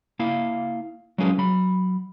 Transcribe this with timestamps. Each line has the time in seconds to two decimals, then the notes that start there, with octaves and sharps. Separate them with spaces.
0.19 A#3 E4 F5
1.18 F#3 G#3 C#4 F4 G#4 B4
1.38 F#3 B5